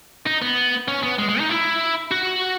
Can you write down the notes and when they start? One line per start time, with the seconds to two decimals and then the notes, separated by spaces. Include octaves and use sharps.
0.26 D#4
0.42 B3
0.88 C#4
1.03 B3
1.19 G#3
1.29 G#3
1.39 D#4
1.50 E4
2.11 F#4